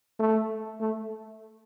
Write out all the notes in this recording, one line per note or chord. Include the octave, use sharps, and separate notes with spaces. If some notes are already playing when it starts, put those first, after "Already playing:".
A3
A3